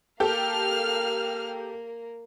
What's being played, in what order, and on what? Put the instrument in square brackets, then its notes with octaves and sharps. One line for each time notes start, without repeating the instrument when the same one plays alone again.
[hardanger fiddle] A#3 A#4 [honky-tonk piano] G4 A4 [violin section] F5 F6